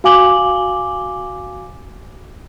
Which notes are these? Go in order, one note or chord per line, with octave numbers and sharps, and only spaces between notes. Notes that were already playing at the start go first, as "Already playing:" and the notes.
F#4 F5 G#5 D6 F#7 G7